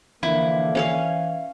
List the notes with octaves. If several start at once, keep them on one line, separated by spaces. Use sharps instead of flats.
D3 E3 F3 A#3 E4
C#4 C#5 F5